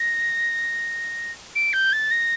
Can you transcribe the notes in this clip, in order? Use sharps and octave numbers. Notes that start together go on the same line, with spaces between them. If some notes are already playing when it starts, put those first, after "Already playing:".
Already playing: A#6
D7
G6
A6
A#6